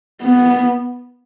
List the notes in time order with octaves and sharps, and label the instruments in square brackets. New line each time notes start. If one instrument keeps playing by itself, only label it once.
[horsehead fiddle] B3